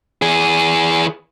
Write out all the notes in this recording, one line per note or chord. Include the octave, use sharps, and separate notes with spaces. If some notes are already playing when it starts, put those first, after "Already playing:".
E3 G#4